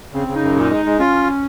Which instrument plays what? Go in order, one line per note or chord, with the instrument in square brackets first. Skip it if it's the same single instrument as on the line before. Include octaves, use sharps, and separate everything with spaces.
[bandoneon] C#3 [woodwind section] C4
[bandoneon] C#3
[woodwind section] D#4
[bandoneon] F#2
[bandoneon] A#2 [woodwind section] D#4
[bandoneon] G#3
G#3
[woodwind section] C#4 [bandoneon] F4